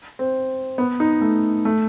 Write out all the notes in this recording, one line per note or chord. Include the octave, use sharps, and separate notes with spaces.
C4
B3
D#4
A3
A3